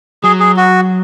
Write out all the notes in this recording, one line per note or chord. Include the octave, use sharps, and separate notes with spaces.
F#3 G#4
G#4
F#4